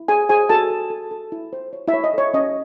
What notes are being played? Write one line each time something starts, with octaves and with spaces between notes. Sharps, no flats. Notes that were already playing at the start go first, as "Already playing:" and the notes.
Already playing: E4
G#4 C5 G#5
G#4 C5 G#5
F#4 A4 A5
A4
A4
A4
E4
C5
C#5
E4 E5
C#5
D#5
A4 C#5
C#4 D#5